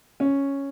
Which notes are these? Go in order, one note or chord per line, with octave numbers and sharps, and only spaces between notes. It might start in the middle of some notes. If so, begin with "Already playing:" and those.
C#4